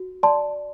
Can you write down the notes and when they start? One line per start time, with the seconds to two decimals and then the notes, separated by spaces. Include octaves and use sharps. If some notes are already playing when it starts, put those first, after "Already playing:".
Already playing: F#4
0.23 D5 A5 C6